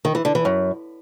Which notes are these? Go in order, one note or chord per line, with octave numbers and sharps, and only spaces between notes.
D#3
E3
D3
E3
F#2